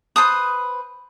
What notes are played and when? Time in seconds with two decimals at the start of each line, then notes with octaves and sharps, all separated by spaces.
0.16 B4 C5 A5 D#6